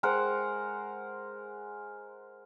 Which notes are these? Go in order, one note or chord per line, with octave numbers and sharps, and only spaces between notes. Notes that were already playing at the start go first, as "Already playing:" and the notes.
G#3 A#4 C5 F#5